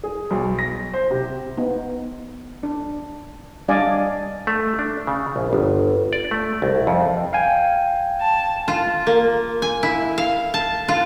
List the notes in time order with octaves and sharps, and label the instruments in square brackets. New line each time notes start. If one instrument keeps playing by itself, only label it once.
[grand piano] G#4
B1
A#6
C5
C3
[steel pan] B3 D#4
D4
G3 D4 D5 D#5 F5 G#5
[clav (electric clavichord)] A3
D4
C#3
A#1
G1
D5
A3
C2
F2
[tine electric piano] F5 G5 G#5
[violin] A5
[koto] F4
A#3
G#5
E4
F5
A5
F4